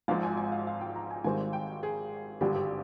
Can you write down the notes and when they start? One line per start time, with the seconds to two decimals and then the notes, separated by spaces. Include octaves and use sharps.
0.08 G#1 G#2 F3 F5
0.23 G#5
0.37 G#5
0.52 F5
0.67 F5
0.81 G5
0.96 A#5
1.11 G#5
1.24 G#1 G#2 D#3 G3 C4 G#5
1.53 G5
1.83 G#4
2.41 G#1 G2 D3 G3 D4 G4
2.55 G4